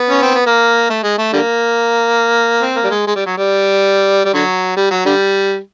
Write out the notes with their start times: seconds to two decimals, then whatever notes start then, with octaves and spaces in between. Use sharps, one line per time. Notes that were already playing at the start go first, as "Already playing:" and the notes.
Already playing: B3
0.10 C#4
0.22 C4
0.34 B3
0.46 A#3
0.90 A3
1.03 G#3
1.18 A3
1.33 D3 G3 A#3
2.62 C4
2.76 A#3
2.84 G3
2.90 G#3
3.07 G#3
3.16 G3
3.26 F#3
3.37 G3
4.25 G3
4.34 D3 F#3
4.77 G3
4.91 F#3
5.05 D3 G3